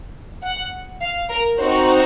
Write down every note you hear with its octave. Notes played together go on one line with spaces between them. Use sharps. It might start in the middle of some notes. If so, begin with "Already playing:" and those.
F#5
F5
A#4
C4 D#4 F#4 C5